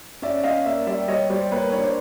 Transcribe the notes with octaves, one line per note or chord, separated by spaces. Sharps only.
C#4 D5 E5
C#4 D#5 F5
A#3 D5 E5
G3 D5 E5
G3 C#5 D#5
G3 C5 D5
A#3 B4 C#5
D4 C#5
C5 D5